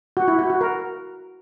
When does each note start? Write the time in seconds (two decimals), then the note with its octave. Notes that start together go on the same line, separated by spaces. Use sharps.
0.17 F#4
0.28 E4
0.39 F#4
0.50 F#4
0.61 A#4